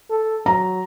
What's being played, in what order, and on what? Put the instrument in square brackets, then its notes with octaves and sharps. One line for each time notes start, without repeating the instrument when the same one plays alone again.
[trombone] A4
[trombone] F#3 [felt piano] A#5